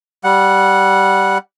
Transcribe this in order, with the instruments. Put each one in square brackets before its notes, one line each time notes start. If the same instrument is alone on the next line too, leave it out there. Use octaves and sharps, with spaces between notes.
[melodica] G3 F#5